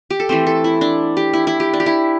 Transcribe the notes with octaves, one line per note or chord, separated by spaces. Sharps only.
G4
A4
E3 A3 C4 C5
A4
E4
D4
G4
E4
E4
G4
D4
G4
E4